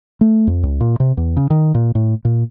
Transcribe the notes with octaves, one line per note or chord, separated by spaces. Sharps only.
A3
F2
C#2
A#2
C3
E2
C#3
D#3
A#2
A2
A#2